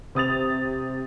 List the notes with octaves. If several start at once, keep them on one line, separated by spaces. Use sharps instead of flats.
C3 D#6 A6 F7